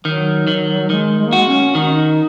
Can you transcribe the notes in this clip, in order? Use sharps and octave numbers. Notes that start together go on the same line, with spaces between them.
D#3 F#3
D#3
D#3 G#3
G#3
A#3
G#3 F#4
C#4
D#3 D#4